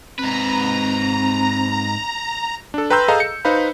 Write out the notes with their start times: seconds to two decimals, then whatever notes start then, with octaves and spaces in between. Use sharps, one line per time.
0.19 G#2 C4 B4 A#5
2.74 D4 A4
2.90 B4 G5 A#5 C6 E6 G6
3.08 G#4 A4 D#5 F5 A#5
3.20 C#7
3.45 D#4 B4 C5 F5 B5